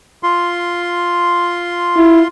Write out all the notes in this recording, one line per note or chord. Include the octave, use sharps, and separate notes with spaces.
F4 C6
E4